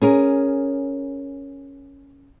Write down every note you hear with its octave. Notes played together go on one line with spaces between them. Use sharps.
C#4 G#4 A#4